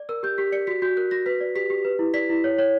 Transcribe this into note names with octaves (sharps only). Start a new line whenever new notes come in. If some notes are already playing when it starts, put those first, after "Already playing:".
Already playing: D5
A#4 E6
G4 G6
G4 B6
D5 C#7
F#4 B6
F#4 G6
A#4 F#6
F#4 A#6
B4 B6
D5
G4 B6
G4
B4
E4
D5 B6
E4
C#5
C#5